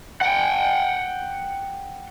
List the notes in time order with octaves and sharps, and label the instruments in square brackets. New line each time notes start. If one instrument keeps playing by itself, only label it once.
[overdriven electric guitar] F#5 G5